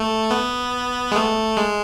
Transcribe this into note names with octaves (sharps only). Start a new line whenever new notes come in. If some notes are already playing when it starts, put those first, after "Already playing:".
Already playing: A3
B3
G#3
A3
G#3